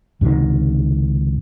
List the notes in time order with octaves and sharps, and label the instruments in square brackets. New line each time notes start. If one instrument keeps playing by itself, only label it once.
[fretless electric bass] C#2 G#2 C3 D#3